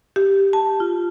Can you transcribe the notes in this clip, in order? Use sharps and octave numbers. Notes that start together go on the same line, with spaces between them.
G4
A5
F4